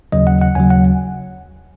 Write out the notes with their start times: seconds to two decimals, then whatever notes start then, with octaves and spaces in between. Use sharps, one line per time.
0.12 D#2 C#3 F#3 D#5
0.27 F#5
0.42 F#5
0.55 D#2 C#3 F#3 G#5
0.70 F#5